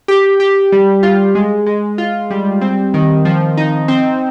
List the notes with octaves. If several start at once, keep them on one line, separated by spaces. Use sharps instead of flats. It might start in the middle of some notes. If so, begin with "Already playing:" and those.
G4
G4
G3
F4
G#3
G#3
F4
G3
C4
D#3
F3
D#4
C4